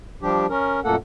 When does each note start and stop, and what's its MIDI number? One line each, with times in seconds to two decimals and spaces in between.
0.22 0.46 53
0.22 0.46 55
0.22 0.46 62
0.22 0.46 67
0.50 0.80 61
0.50 0.80 70
0.84 0.96 42
0.84 0.96 46
0.84 0.96 57
0.84 0.96 58
0.84 0.96 69
0.84 0.96 78